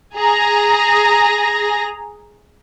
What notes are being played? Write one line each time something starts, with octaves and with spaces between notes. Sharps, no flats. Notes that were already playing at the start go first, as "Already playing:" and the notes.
G#4 A#5 A#6